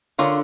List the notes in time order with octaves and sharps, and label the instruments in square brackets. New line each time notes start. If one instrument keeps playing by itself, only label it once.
[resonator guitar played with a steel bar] D3 [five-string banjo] C#4 F4 A#4 D5